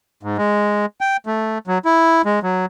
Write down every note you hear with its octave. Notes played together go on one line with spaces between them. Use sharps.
G#2
G#3
G5
A3
F#3
E4
G#3
F#3